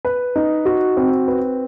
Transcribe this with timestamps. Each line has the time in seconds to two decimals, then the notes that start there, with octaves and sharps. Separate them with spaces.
0.05 B4
0.36 D#4
0.65 F#4
0.97 C4
1.28 B4